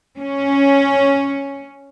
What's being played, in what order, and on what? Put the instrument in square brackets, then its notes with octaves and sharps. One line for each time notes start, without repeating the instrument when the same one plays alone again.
[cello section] C#4